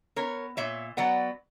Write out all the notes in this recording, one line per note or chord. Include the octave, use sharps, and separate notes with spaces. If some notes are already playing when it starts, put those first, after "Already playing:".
B3 A#4 C#5
A#2 C#5 E5
F#3 B3 D5 F#5